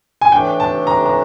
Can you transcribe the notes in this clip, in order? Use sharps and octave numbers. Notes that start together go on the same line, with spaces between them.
G#5
A2 E3 A3 D4 G5
A5
A#5
A#5